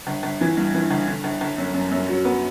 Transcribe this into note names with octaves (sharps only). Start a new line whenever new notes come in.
G1
G1
E3
G2
E3
G1
D3
G1
G1
F#2
F#2
F#2
F#3
B3